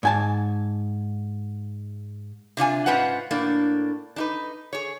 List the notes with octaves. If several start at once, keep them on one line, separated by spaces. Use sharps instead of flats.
G#2 G#5 A5
C3 D4 F4 G#5
G#2 C#4 F4 B4 C5 F#5
A2 A#3 D4
D4 D#4 B4
G#4 C#5